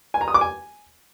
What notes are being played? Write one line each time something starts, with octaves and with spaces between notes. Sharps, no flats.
G#5
A#5
D#6
D6
G#5